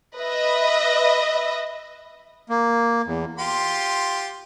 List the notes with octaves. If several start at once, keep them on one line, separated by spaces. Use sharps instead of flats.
B4 D#5 E5
A#3
E2
F4 G4 C6